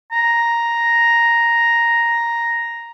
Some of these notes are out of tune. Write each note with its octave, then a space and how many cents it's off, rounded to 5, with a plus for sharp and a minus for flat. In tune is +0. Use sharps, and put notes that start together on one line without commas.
A#5 +0